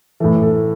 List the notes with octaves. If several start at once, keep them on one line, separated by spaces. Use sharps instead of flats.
A2 E3 A4
A4